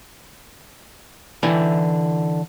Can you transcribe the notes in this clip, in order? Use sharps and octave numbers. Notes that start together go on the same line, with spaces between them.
D3 E3 E4 G5 G#5